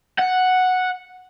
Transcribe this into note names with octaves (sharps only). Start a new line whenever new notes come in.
F#5